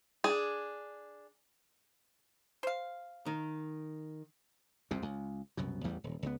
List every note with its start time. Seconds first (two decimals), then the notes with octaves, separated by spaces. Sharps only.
0.24 D4 G#4
2.63 C5 F5
3.26 D#3
4.91 C2 F2 C3
5.02 C#2
5.57 C2 F#2 B2
5.84 A1 E2 G3
6.04 D#1
6.23 C#2 B3